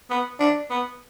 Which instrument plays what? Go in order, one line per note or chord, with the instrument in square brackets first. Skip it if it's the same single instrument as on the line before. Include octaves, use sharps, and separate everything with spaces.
[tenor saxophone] B3
D4
B3